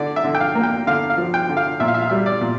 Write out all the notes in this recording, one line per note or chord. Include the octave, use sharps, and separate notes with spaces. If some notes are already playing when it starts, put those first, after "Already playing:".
Already playing: D3 D5
E5
D3
G5
F5
A#3
G5
D3 F5
F5
F3
G5
D3
F5
A#2 E5
F5
E5
F5
G3 E5
D5
A#2